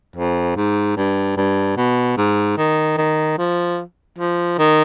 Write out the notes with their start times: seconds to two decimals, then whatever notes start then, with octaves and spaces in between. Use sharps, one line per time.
0.16 F2
0.56 G#2
0.97 G2
1.37 G2
1.77 B2
2.17 G#2
2.58 D#3
2.97 D#3
3.38 F3
4.18 F3
4.59 D#3